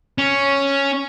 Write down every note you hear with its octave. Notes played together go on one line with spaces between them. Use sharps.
C#4